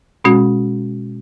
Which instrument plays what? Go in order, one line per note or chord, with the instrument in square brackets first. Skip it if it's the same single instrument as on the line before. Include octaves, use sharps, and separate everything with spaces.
[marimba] B2 G#3 C#4 F#4